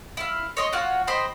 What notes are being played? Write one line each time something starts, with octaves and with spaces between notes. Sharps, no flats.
E4 F5
C#5 D#5 C6
F4 F#4 C#5 F#5
C5 D#5 G5 B5